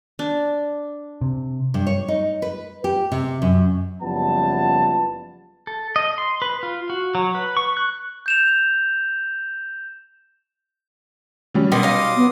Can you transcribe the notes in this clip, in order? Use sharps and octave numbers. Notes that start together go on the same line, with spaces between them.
D4
C3
G2
C#5
D#4
B4
G4
C3
F#2
F#1 F3 G3 B3 A5
A4
D#5
C6
B4
F4
F#4
F#3
B4
C#6
F#6
G6 E7 F7
F#3 G3 C#4
B2 D#3 C6 D6 D#6
D#4 F5
B3